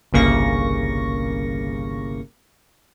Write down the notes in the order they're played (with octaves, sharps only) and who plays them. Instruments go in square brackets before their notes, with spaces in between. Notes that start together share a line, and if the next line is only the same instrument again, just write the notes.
[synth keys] G1 C2 C#3 A#3 C#6 A#6